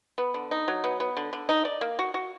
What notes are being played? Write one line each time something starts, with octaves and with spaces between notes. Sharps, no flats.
B3
D3
D#4
F#3
B3
B3
D3
D3
D#4
D5
A#3
F#4
F#4